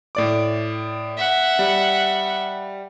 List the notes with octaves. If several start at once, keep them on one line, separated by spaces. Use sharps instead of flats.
A2 D5 D6
E5 F#5
G3